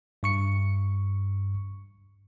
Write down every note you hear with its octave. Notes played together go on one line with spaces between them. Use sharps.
G2 C#6 C#7